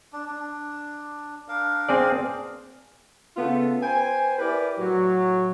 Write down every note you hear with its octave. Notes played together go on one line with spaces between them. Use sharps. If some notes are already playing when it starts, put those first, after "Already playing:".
D4
D4
D4 A#4 F5
C4 G#4 D5
C#3 A3 B3 F4 A4
B4 C5 G5 G#5
E4 G4 A#4 B4 D5
A2 F#3